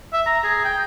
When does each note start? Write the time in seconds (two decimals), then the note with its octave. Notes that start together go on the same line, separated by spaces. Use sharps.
0.13 E5
0.26 A#5
0.44 G#4
0.64 G5